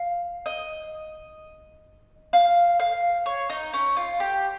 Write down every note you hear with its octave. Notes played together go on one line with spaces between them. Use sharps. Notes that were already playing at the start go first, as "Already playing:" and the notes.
Already playing: F5
D#5
F5
F5
C#5
D#4
C#4
F4
G4